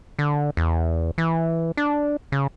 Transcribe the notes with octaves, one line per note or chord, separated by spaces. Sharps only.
D3
E2
E3
D4
C#3